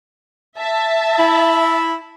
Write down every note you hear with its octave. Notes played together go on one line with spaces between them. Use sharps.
E5 A5
E4